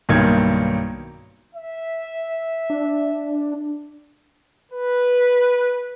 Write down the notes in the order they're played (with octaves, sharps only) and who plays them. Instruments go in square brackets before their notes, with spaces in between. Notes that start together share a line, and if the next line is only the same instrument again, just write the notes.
[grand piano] B1 G2 D#3 A#3 G#6
[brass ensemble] E5
[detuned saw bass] D4
[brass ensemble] B4